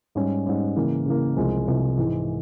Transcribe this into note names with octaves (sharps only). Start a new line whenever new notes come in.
G#2 G3 C#4
G#2 G3 C#4
C#3 E3 A#3
C#3 E3 A#3
C2 C3 F3 G#3
C2 C3 F3 G#3
G#2 E3 G#3